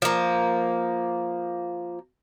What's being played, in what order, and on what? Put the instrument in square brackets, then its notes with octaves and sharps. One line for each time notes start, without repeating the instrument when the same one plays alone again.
[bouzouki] F3 A#3